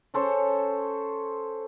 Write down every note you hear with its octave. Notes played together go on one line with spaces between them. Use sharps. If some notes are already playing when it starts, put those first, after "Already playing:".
C#4 A4 C5 C#5